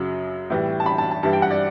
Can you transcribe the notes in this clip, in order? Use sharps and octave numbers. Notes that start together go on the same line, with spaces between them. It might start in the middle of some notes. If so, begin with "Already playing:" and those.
Already playing: F#2 C#3 F#3
A2 E3 G3
A5
B5
A5
A5
G2 E3 G3 A5
G5
F#5
D5